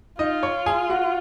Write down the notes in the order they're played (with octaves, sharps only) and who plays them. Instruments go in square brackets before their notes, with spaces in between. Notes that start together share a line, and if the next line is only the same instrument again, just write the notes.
[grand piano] D#4 D#5 [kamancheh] F4
[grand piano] C#5 C#6
G#4 G#5
F#4 F#5